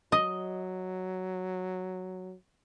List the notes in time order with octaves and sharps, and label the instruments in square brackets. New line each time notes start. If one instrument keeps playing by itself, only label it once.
[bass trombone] F#3 [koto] D#5